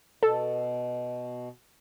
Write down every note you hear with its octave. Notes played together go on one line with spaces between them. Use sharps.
B2 A4